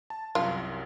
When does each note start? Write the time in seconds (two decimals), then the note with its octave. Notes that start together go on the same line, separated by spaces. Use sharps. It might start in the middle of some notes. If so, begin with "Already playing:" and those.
0.10 A5
0.35 C2 F#2 F4